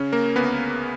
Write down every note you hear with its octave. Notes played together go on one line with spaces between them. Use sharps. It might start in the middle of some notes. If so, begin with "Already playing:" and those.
Already playing: C#3 C#4
A#3 A#4
D2 B3 B4